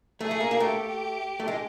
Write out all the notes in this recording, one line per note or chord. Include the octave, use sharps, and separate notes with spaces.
A3 G#4
A3
A#3
A#3
A3 G4
A3
G#3